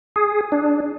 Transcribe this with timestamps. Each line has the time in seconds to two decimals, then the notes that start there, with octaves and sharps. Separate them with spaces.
0.16 G#4
0.52 D4